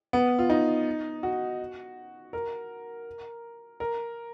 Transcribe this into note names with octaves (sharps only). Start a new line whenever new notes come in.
B3
F4
D#4
F#4
A#4
A#4